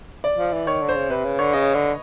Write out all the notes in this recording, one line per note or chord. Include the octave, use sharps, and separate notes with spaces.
D5
F3
E3
D#3 C#5
D3
C5
C#3
C3 B4
C#3
D3 C#5
C#3 D#5
D3